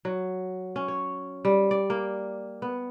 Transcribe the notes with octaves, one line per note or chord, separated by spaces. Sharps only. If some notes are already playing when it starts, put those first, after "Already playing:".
F#3
C#4
C#5
G3
D5
A#3
B3